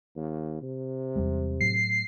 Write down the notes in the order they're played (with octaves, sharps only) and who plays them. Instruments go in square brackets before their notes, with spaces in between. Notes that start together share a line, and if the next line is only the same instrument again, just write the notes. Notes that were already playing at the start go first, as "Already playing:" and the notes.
[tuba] D#2
C3
[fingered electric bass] E2 G3 G#3
[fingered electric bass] A2 F#3 A3 [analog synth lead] C7